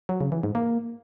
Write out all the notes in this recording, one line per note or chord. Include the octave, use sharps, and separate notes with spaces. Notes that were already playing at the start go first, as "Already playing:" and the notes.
F#3
C#3
E3
G#2
A#3